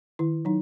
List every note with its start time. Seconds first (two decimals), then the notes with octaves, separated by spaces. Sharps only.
0.19 D#3 E4
0.45 F#3 D#4